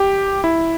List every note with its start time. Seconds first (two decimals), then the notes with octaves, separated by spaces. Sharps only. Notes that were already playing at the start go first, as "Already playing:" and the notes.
Already playing: G4
0.44 E4